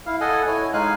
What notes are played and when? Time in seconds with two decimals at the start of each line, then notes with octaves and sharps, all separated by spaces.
0.06 E4 F5
0.21 A4 D#5 F#5 G#5
0.47 E4 C#5 G#5
0.73 G#3 D#4 F5 G#5 F#6